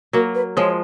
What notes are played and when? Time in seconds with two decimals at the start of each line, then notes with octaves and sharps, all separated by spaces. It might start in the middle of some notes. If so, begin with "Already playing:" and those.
0.13 F#3 A#3 A#4
0.35 B4
0.57 F3 G#3 C#5